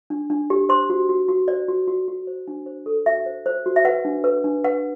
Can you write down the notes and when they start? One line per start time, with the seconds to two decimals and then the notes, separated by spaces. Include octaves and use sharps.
0.10 D4
0.30 D4
0.50 G4
0.69 C5 C6
0.90 F#4
1.09 F#4
1.29 F#4
1.48 C5 D5
1.68 F#4
1.87 F#4
2.08 F#4
2.27 C5
2.48 D4
2.66 C5
2.86 A4
3.06 F#4 E5
3.26 C5
3.46 C5
3.66 F#4
3.76 E5
3.85 B4 F#5
4.05 D4
4.24 B4
4.44 D4
4.64 B4 F#5